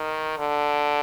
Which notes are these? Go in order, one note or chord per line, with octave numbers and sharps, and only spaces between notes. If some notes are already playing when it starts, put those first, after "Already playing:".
Already playing: D#3
D3